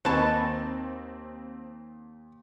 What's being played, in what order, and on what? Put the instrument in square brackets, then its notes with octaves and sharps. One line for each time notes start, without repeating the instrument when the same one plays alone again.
[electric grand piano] D#2 [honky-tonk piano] C4 E7 [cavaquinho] D#4 G#5 C#6 [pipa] B4 A5